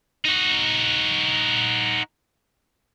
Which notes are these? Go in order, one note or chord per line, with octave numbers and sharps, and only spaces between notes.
D#4 F#4